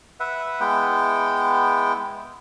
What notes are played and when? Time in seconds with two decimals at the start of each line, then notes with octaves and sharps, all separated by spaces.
0.20 B4 E5 F#5
0.60 G#3 B3 E4 G5